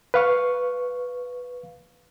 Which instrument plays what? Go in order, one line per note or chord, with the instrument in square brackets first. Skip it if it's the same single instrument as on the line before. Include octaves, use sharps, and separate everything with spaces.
[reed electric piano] B4 F5 C#6